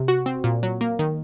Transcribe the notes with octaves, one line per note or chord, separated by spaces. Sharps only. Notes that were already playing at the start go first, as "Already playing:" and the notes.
Already playing: C3
F#4
C4
A#2
F#3
A#3
D#3